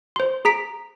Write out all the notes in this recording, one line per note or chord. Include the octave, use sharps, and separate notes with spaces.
C5 C6
G#4 A#5 B6 D7